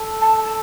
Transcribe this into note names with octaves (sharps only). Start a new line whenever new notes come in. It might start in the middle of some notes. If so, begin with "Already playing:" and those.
Already playing: A4
A5
A5